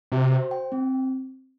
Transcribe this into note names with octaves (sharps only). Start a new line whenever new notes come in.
C3 F#4
C5
G5
C4